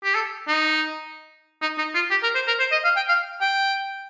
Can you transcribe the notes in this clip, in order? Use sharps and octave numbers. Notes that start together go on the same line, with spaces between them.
G4
A4
D#4
D#4
D#4
F4
G4
A#4
C5
A#4
C5
D#5
F5
G5
F5
G5